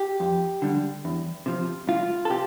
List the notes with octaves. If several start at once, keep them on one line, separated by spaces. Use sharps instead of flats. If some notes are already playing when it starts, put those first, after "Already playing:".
Already playing: G4
F2
D3 G3
E2
C3 F3
C2 F4
A4
C3 G4